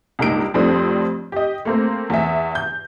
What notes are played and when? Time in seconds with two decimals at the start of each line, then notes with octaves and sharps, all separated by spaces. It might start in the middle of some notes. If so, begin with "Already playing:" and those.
0.19 C#2 G2 A#3 D#4 D7
0.54 F2 A2 G3 A3 C4 D4
1.32 G4 D#5
1.65 A3 A#3 C4
2.10 E2 E5
2.55 G6